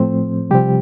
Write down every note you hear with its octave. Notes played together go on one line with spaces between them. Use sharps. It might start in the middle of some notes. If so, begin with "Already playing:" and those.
Already playing: A2 F3 A3 C4 C5
C3 F3 G3 C4 G4